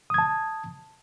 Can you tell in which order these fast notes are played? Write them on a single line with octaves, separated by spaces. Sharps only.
D#6 G#6 A5